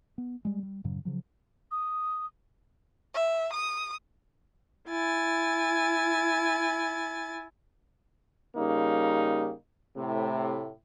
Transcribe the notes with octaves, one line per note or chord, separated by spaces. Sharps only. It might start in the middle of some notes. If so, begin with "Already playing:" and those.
B3
G3 G#3
G3
F#2 A2 C#3 F#3
C#3 F3 F#3
D#6
E5
D#6
E4 G#5 A6
C#3 G3 A#3 D#4
A2 C3